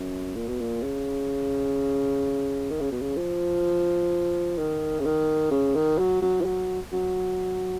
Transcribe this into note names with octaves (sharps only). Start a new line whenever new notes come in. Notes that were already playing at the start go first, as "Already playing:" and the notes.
Already playing: F#2
A#2
B2
A#2
C#3
D#3
C#3
B2
C#3
F3
D#3
C#3
D#3
C#3
D#3
F#3
F#3
F3
F#3
F#3